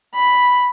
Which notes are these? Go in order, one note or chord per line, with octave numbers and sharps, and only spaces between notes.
B5